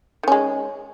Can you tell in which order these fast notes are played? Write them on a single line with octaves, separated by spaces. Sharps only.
D#3 C#4 G#3